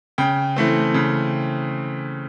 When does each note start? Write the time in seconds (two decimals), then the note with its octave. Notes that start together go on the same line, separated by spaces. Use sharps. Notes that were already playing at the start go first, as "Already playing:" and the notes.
0.18 C#3 G5
0.56 E3 A3 C4
0.94 C#3